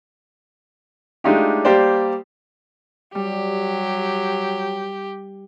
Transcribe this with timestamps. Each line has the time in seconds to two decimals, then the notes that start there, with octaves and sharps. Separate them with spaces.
1.24 G#3 A3 D4 D#4 F4 G4
1.65 G3 A#3 G4 C5 D5
3.15 F#3 G3 G4